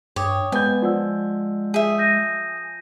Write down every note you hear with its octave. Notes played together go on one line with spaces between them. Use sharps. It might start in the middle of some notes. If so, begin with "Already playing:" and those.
G2 C#5 G5 D6 D#6
G#3 B3 G#5 G6
F3 D5 F#5 E6
G#4 E5
G6 A#6 D#7